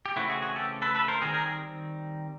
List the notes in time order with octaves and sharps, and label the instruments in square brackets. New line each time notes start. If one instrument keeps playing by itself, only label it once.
[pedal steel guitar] G4
C#3 E3 A3 C4 E4 F#4
F#4 G#4
F#4 G#4
G4 A4
A4 B4
A4 B4
A#4 C5
D#3 G3 C4 G#4 A#4
G#4 A#4